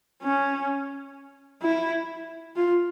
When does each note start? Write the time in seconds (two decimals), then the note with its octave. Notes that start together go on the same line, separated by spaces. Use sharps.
0.23 C#4
1.62 E4
2.56 F4